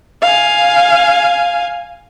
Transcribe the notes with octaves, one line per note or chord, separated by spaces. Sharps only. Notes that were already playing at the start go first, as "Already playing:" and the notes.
F5 G#5